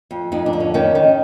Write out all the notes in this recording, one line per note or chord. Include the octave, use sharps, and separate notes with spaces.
F2
F2 D#4
D4
D3
C#4
D#3 C#4
D#3